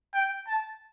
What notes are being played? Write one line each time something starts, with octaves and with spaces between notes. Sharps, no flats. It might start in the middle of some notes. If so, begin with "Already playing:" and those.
G5
A5